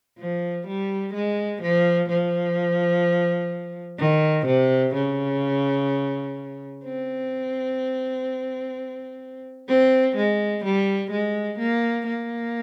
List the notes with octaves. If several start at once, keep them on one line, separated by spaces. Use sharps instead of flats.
F3
G3
G#3
F3
F3
D#3
C3
C#3
C4
C4
G#3
G3
G#3
A#3
A#3